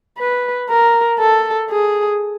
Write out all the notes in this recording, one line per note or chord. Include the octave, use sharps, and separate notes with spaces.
B4
A#4
A4
G#4